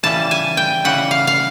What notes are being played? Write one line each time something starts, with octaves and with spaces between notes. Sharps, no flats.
C#3 E3 G3 A5
G#5
G5
C#3 E3 G3 F#5
F5
F5